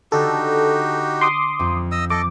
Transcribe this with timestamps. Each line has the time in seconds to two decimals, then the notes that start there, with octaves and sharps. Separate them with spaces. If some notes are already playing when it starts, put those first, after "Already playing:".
0.12 D3 D#4 F#4 G4 A4
1.21 C6 D6 D#6
1.59 F2
1.92 D#5 D#6 E6
2.10 F3 A4 D#5 D6